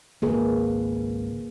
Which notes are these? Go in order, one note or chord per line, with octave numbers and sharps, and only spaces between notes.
G#1 C#2 A#3 G#4 B4